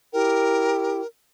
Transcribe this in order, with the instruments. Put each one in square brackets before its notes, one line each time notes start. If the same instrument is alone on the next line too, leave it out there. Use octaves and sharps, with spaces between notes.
[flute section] E4 G4 G5 [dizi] A#4